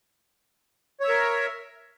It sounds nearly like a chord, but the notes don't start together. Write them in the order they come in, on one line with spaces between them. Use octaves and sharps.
C#5 E5 A#4